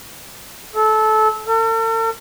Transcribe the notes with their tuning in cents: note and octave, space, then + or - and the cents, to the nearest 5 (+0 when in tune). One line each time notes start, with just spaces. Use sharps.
A4 -20
A4 +45